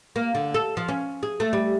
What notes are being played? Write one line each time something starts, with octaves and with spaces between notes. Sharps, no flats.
A#3
D3
A4
F3
C#4
G#4
A3
G3